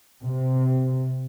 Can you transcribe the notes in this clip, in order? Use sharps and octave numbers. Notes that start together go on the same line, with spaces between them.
C3